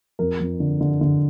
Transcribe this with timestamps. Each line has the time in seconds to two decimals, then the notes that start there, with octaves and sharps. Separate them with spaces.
0.19 F2 A#4
0.40 F2
0.60 D3
0.81 D3
1.01 D3